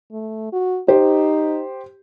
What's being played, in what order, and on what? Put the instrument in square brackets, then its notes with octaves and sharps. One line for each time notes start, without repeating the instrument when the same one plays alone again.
[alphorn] A3
F#4
[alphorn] D#4 [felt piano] G4 C5